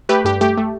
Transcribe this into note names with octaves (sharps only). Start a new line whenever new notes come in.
A3 G4 B4
G2 G4
A3 G4
A3